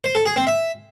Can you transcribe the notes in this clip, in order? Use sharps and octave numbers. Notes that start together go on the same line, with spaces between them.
C5
A4
G#4
C4
E5